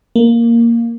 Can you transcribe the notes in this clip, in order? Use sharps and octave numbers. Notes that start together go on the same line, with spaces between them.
A#3